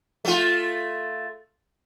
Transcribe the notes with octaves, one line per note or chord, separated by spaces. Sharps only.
A3 F4